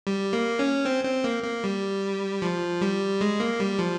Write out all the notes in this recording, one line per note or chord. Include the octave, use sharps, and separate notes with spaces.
G3
A#3
C#4
C4
C4
A#3
A#3
G3
F3
G3
G#3
A#3
G3
F3